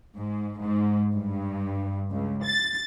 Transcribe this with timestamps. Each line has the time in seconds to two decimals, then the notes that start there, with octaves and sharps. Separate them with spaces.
0.16 G#2
0.60 G#2
1.15 G2
2.11 C#2
2.42 A6